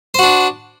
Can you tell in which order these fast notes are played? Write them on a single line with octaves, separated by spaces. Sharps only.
C5 F#4 D4